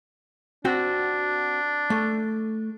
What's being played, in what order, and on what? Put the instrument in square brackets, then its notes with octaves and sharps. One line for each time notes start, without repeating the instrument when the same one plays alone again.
[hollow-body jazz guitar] C4 F#4 G5 [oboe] D4
[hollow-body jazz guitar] A3